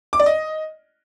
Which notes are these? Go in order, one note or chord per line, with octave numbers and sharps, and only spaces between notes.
D6
D5
D#5